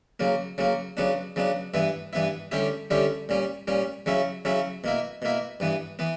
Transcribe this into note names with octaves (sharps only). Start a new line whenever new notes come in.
C#3 F#3 A#3
C#3 F#3 A#3
C#3 F#3 B3 D4
C#3 F#3 B3 D4
G2 E3 B3 E4
G2 E3 B3 E4
D3 G3 C#4 E4 G4
D3 G3 C#4 E4 G4
A#2 G3 C#4
A#2 G3 C#4
C#3 F#3 C#4 E4
C#3 F#3 C#4 E4
B2 A#3 E4
B2 A#3 E4
G2 E3 B3
E3 B3